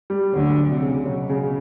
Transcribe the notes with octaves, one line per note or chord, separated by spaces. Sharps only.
G3
D2 D3 F#3
F#3
C3
C#3
B2 F#3
C#3